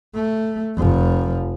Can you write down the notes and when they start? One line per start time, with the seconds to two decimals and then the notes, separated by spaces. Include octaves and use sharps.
0.15 A3
0.77 F1 F3